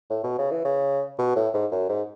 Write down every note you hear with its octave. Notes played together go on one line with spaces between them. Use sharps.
A2
B2
C#3
E3
C#3
B2
A2
G#2
F#2
G#2